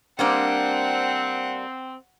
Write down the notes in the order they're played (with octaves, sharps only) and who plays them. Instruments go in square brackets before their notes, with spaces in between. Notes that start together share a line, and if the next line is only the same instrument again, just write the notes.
[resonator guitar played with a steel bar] G3 A#3 D4 [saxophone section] C4 [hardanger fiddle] F#5